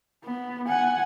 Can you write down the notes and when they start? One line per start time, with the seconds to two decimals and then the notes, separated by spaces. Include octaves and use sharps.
0.24 B3
0.68 F#5 G#5